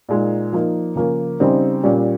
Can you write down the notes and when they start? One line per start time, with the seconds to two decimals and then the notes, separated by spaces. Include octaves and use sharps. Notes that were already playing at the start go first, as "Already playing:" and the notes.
0.09 A#2 G#3 D#4
0.53 F3 A#3 D#4
0.96 C#3 F3 A#3 C#4
1.40 C#3 G3 C4 D#4
1.83 A#2 G3 C#4